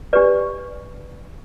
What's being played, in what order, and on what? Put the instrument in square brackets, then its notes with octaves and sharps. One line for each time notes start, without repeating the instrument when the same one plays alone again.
[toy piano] D4 G4 B4 D5